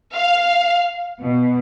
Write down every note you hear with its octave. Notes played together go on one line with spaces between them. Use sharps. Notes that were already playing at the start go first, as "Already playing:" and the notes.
F5
B2